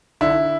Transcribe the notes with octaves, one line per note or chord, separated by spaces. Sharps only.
D3 E4